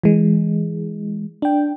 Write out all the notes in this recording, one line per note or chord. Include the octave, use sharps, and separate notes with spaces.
E3 G#3
D4 G5